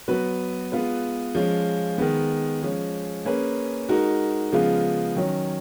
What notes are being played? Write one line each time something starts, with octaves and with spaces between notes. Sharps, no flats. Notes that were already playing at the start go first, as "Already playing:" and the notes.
F#3 B3 F#4 B4
G#3 B3 F4 B4
F3 G#3 C#4 F4
D#3 G#3 B3
F3 G#3 C#4
A#3 C#4 G#4 B4
G#3 D#4 F#4 A#4
C#3 F3 G#3 B3 F4
D#3 F#3 C#4